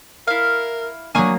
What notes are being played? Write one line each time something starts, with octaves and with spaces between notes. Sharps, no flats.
E4 A#4 F5
F#3 A#3 D4 G#5 C#6 D#6